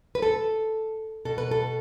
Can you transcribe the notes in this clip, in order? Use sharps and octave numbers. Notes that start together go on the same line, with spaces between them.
B4
A4
B2 A4
B4
A4